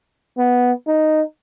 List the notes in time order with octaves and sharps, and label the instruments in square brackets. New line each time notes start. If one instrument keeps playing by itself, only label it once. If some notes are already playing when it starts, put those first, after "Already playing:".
[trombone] B3
D#4